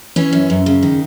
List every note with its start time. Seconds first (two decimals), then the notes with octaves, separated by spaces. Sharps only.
0.16 E3 C#4
0.33 F#2
0.50 F#2
0.66 C#3
0.83 D#3